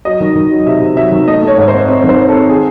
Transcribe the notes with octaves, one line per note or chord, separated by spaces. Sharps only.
F#3 D#5
D#3
D#3
F#3
C3 E5
C3
F#3 E5
D#3
A3 D#5
A3 C#5
G#2
C5
C4
C4
D#3
C5
C4
A4
C4
G#4